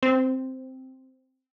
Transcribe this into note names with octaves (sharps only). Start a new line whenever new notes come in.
C4